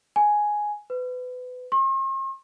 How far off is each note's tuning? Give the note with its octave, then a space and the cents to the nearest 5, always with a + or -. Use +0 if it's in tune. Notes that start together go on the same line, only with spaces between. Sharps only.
G#5 +5
B4 +25
C6 +45